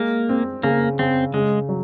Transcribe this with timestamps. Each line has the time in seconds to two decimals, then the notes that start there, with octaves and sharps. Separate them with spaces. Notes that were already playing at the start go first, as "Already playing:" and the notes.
Already playing: G#3 A#3
0.29 C4
0.63 C#3 A#3
0.99 C#3 C4
1.34 C#3 G#3
1.69 F#3